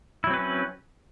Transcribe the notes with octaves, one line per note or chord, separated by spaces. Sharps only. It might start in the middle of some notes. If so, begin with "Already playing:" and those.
F#3 C4 C#4 E4 B4